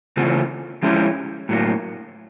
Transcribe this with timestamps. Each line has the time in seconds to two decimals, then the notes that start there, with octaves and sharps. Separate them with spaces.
0.17 C#3 E3 A3 C4 F4
0.83 F3 G#3 C#4 E4 G4
1.49 A2 F#3 A#3